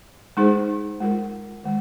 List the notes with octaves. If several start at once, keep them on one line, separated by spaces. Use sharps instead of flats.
G#3 D#4 G#4 C5
G#3 F4 A#4
D#3 G#3